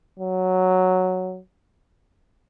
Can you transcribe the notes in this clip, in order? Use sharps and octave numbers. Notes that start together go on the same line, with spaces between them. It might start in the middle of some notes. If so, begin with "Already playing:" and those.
F#3